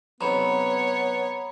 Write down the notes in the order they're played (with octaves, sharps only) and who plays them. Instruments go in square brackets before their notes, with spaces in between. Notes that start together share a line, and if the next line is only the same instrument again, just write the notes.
[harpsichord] B1 C3 [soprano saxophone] B3 [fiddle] C#5 [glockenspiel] A#5 B5